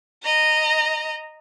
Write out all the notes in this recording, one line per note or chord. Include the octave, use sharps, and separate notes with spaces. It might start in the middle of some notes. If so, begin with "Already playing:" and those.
D#5 A#5